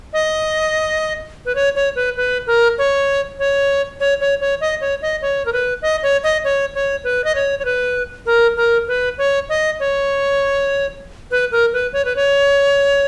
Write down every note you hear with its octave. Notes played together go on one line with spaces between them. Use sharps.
D#5
B4
C#5
C#5
B4
B4
A#4
C#5
C#5
C#5
C#5
C#5
D#5
C#5
D#5
C#5
A#4
B4
D#5
C#5
D#5
C#5
C#5
B4
D#5
C#5
C#5
B4
A#4
A#4
B4
C#5
D#5
C#5
B4
A#4
B4
C#5
B4
C#5